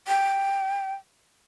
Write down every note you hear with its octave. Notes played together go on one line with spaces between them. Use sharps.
G5